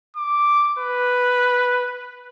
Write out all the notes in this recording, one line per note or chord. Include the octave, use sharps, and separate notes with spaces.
D6
B4